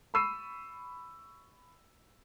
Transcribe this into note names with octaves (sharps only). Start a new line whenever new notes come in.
B5 C#6 E6 C7 D#7